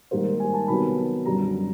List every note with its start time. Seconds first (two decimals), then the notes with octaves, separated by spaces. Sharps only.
0.11 G#2 D#3 G3 A#3 C5
0.40 G#5
0.54 A5
0.68 C3 D#3 F#3 B3 B5
1.26 F#2 D3 G3 A#5